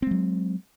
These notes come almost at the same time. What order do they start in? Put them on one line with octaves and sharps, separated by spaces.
C4 G#3 F#3